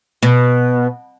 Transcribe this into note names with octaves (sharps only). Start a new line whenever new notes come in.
B2